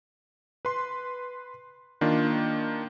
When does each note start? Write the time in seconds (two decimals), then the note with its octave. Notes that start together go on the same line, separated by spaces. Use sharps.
0.65 B4 C6
2.01 D#3 A#3 D4 F4